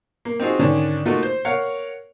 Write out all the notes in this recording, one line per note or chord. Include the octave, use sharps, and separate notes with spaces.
A#3
C4 D#4 F4 F#4 G#4
G#2 D3 D#3 C#4 D4
A3 A#3 D#4 F4 F#4
C5
A#4 C#5 F5 F#5